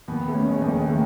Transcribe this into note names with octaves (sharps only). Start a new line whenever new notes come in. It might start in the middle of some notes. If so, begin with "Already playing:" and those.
D#2 B3
A3
C#4
G#3
D#2
G#3
D#3 A3